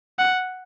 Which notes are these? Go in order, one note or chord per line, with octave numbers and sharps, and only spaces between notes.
F#5